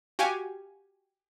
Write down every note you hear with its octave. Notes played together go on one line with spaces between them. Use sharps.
F#4 G4 F5 G#5